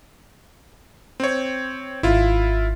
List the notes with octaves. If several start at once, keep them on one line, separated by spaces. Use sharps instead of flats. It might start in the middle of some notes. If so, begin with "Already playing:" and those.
C4 C#5
G#1 E4 F4